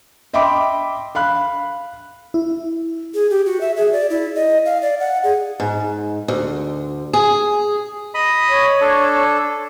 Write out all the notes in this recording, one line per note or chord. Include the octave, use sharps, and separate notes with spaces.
D#5 E5 G5 B5 C6 D6
F5 B5 F#6
E4
G#4
G4
F#4
E5
G#4
D5
E4
D#5
F5
D5
F#5
G#4
G#2
D2
G#4
D#5 B5 D#6
C#5
D4 A4